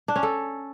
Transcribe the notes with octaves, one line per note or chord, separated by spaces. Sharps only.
D4
C#4
A4